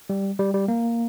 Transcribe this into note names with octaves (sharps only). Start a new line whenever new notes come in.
G3
G3
G3
A#3